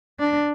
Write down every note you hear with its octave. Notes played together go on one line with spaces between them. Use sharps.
D4